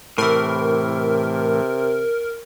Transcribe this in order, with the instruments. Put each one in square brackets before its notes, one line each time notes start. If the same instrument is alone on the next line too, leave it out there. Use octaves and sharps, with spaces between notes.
[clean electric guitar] A2 E3 [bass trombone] C3 [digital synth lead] A#4